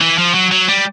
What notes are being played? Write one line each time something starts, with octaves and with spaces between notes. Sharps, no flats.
E3
F3
F#3
F#3
G3